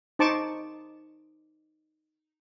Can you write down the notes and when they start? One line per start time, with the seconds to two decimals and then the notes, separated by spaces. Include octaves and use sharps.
0.19 D#4 C5 A5 C#6 D6